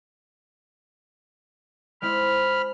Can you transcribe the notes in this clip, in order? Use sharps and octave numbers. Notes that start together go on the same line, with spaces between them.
G#3 C4 E4 B5 F6